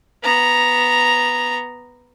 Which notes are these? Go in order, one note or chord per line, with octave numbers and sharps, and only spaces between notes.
B3 A#5